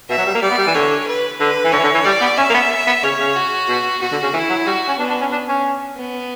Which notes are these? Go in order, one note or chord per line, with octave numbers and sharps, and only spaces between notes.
B2 E5
F#3
G3
A#3
G3 D5
B3
G3
E3
D3 C#5
B4
D3 B4
E3
D3 C#5
E3
D3
E3
G3 D5
B3
C#4 E5
A#3
B3
B3
C#3 C#5
C#3
F#4
B2
B2 F#4
D3
C#3
E3 E4
F#3
G3 F#4
C#4
B3 D4
D4
C#4
D4
C#4
B3